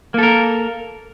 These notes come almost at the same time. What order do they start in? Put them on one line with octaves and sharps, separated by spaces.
A#3 A4 A#4